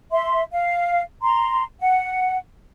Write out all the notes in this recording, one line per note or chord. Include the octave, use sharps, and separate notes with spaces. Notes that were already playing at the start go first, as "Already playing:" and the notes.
E5 C6
F5
A#5 C6
F#5